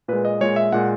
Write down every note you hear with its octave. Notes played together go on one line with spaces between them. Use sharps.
A#2 G#3 B4
D#5
A#2 G#3 C#5
E5
A#2 G#3 F#5